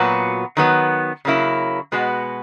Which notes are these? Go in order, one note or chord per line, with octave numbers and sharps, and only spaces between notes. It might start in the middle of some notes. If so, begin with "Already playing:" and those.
Already playing: A#2 F#3 B3 F#4
D#3 F#3 B3
C#3 F#3 A#3 E4
B2 G#3 B3 F#4